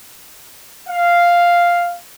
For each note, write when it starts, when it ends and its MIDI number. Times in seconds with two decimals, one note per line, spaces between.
0.88 1.95 77